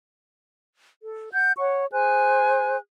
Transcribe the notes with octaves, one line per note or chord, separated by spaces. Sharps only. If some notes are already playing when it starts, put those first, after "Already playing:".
A4
F#5 G6
C#5 F#5 C#6
G#4 C5 G#5 F#6